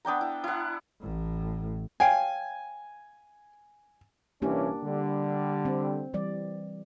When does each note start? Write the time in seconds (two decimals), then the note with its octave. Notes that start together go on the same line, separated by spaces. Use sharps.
0.05 B3 D4 G5 A#5
0.21 E4
0.44 E4 F#5
1.00 A1 A2
2.00 C#5 F5 G5 G#5
4.42 C2 E3 A#3 C#4 D4 G4
4.84 D3 G3
5.65 C4
6.14 E3 G3 D5